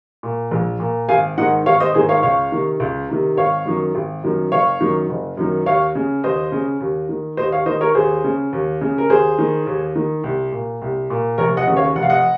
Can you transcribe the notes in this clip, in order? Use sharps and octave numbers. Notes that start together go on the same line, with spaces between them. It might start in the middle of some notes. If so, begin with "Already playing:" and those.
A#2
A#1
A#2
G#1 F5 G#5
G#2 D#3 D#5 F#5
G#1 C#5 F5
C5 D#5
G#2 D#3 G#4 C5
C#5 F5
C#2 C#5 F5
C3 D#3
C#2
C3 D#3
G#1 C#5 F5
F#2 D#3
G#1
F#2 D#3
F#1 C#5 F5
F#2 D#3
F#1
F#2 D#3
D#2 C#5 F5
C#3
D#2 C5 D#5
C#3
D#2
D#3
D#2 C5 D#5
C#5 F5
D#3 C5 D#5
A#4 C#5
D#2 G#4 C5
C#3
D#2
C#3
A#4
D#2 G#4 C5
D#3
D#2
D#3
C2
A#2
C2
A#2
F1 A#4 C#5
D#5 F#5
D#2 C#3
C#5 F5
F1 F#5
F5
D#5 F#5